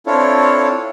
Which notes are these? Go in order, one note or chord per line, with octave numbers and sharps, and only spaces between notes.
C4 D4 E4 F4 A4 C#5